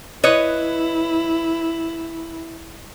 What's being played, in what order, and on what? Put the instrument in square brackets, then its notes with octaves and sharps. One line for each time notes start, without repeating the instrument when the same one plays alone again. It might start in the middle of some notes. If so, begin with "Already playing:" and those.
[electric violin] E4 [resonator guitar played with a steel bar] B4 C#5 D#5